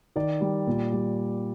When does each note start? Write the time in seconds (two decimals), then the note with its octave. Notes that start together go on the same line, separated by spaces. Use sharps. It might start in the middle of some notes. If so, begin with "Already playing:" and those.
0.16 D#3 D5
0.41 G3
0.67 A#2
0.92 G3